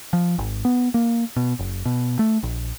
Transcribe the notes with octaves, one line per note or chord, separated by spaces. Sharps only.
F3
G#1
B3
A#3
B2
F#1
B2
A3
A#1